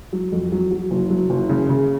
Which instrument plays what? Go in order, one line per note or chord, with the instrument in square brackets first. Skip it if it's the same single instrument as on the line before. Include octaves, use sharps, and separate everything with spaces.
[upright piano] F#3
F2
F#3
F#3
F#1
F#3
F#1
C#3
C#3